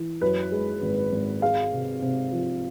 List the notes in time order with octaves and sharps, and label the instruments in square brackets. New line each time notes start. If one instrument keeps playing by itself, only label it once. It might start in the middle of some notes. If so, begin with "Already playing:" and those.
Already playing: [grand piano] E3
[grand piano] F#2 [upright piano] B4
[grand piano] G#3
G#1
G#1
[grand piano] G#3 [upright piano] F5
[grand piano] C3
C3
F3